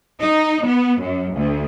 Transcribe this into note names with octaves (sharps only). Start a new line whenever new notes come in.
D#4
B3
F#2
D2